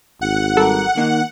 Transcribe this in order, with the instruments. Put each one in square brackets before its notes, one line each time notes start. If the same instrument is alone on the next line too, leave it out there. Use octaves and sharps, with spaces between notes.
[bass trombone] G#1 [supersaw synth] F#5
[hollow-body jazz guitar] G3 A#4 [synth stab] A4
[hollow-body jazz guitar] D#2 A#3 D#4 [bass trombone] D#3